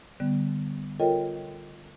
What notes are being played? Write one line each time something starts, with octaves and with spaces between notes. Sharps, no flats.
D3 G3 B3
F4 A4 A#4 C#5 D#5 G5